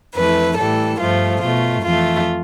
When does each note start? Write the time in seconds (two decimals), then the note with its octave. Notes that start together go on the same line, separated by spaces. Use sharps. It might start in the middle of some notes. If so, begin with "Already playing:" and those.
0.14 F2 E3 A3 B4
0.57 A2 E3 G3 A4
0.99 G2 F3 A3 F4
1.41 B2 A3 F4
1.83 F2 E3 A3 F4